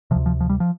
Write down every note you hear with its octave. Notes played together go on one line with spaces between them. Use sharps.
D2 C3 F3
F3
F3
G3
F3